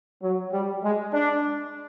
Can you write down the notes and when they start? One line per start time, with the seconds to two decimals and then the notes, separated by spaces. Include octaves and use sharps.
0.23 F#3
0.52 G3
0.83 G#3
1.13 D4